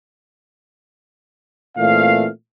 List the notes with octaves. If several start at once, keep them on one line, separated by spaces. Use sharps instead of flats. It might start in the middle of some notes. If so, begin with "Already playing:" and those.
A#2 E3 A3 C4 F5